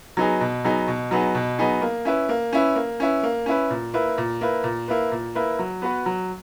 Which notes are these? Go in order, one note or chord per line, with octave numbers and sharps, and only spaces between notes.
F#3 B3 D#4 G#4
B2
F#3 B3 D#4 G#4
B2
F#3 B3 D#4 G#4
B2
F#3 B3 D#4 G#4
A#3
C#4 E4 B4
A#3
C#4 E4 B4
A#3
C#4 E4 B4
A#3
C#4 E4 B4
A#2
A#3 E4 B4
A#2
A#3 E4 B4
A#2
A#3 E4 B4
A#2
A#3 E4 B4
F#3
B3 F#4 B4
F#3